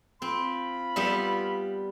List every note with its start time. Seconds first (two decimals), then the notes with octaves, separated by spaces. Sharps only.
0.22 C4 F4 B5
0.96 G3 B3 E5